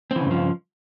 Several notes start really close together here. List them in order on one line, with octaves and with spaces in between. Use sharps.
C4 E3 C#3 G2 F3